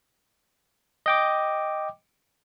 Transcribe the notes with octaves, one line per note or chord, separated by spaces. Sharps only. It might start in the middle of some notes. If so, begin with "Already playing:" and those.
D#5 G5 D6